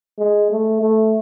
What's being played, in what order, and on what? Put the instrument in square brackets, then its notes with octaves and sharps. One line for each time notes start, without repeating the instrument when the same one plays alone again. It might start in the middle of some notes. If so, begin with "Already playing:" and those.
[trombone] G#3
A3
A3